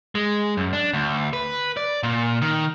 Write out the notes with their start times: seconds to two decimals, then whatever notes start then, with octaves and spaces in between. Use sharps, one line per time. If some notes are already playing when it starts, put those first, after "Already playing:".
0.15 G#3
0.57 F#2
0.73 D4
0.93 D2
1.33 B4
1.77 D5
2.03 A#2
2.42 D#3